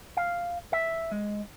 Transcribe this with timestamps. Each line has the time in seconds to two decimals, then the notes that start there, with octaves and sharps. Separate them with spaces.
0.17 F5
0.73 E5
1.11 G#3